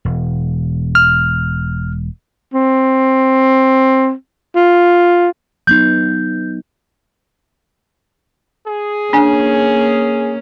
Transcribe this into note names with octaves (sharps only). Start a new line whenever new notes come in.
E1
F6
C4
F4
F#3 B3 D#4 G6
G#4
A#3 C#4 D4 G#5